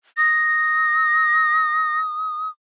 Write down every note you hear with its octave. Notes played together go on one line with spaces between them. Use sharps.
D#6 A#6